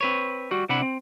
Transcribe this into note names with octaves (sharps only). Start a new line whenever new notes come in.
C4 B4 C#5
G3 F#4
C3 D4 E4 F#5 B5
C4